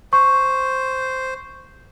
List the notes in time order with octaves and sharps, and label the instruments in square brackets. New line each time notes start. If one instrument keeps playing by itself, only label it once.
[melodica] C5 [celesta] C#6